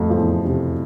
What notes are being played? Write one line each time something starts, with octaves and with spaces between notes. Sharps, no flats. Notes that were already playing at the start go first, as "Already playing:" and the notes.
Already playing: F2 A2 F3 A3
F3
E2 E3
C3